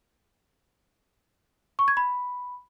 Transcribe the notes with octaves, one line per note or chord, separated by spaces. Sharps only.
C#6
G#6
B5